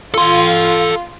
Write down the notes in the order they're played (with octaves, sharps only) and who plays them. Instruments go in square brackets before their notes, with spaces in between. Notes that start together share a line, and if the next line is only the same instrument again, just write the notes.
[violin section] F4 [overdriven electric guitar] A4 C6